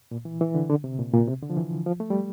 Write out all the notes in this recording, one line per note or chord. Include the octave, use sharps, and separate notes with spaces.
A#2
E3
E3
D3
D3
C3
A#2
A#2
C3
D3
F3
E3
F3
A3
G3